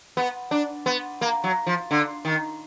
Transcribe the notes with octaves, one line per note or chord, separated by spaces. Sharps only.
B3
D4
B3
A#3
F#3
F3
D3
D#3